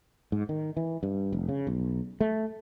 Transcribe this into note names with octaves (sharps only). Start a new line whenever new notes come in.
G#2
D#3
E3
G2
F1
C#3
B1
A3